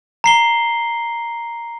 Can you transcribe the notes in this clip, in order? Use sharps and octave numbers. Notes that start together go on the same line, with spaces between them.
A#5 C7 G7